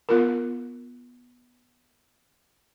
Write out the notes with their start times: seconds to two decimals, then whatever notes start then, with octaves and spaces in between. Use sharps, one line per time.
0.09 B3 F4 A#4